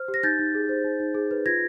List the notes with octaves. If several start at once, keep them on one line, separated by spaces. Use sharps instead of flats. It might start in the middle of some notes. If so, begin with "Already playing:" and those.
Already playing: C5 F6
G4
A#6
D#4 G6 A6
D#4
G#4
C5
D#4
D#4
G#4
B4
F4 G#6 A#6